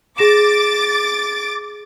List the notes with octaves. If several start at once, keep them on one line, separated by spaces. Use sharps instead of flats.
G#4 D6 A6 A#6 E7